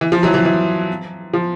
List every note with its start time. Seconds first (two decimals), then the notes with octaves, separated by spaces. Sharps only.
0.01 E3
0.12 F3
0.23 E3 F#3
0.34 E3 F#3
0.45 E3
1.34 F3